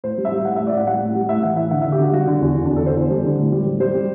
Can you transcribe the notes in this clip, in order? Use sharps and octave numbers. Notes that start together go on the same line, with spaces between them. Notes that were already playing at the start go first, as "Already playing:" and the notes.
A2 C5
G3
E5
G3
A2 F#5
A2 E5
D5
A2 F#5
G3 F#5
A2
G3
A2 E5
E3 F#5
E3 E5
D3 F#5
D3 E5
G4
D3 F#4
G3 F#4
D3
E2
E2
E2 D4
A4
D3 C5
E2 C5
G3
D3
A2
G3
G3
G3 C5
G3